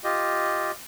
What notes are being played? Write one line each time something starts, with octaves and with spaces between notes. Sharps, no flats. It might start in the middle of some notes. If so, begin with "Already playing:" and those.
F4 G4 D#5